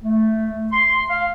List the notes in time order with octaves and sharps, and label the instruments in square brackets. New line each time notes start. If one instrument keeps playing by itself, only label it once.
[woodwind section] A3
C6
F5